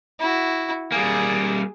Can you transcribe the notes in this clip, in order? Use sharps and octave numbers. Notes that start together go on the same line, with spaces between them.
E4 F#4
G3 A#3 G#4